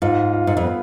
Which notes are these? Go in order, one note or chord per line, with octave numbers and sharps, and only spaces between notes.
G#2 F4
F4
G#2
F2
B3